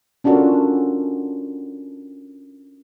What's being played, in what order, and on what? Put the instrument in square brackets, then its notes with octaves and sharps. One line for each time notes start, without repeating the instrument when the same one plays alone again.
[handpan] C#4 D4 F4 F#4 A4 A#4